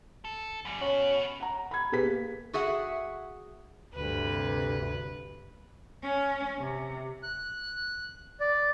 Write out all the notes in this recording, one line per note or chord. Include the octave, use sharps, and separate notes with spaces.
A4
F#2 G3
B3 C#4 F#4
F#5 A#5
B5 G#6
B2 G4 G#4 B4 B6
A#3
F#4 G#4 E5 F#5
D2 G2 C3 B4
C#4
C3
F#6
D5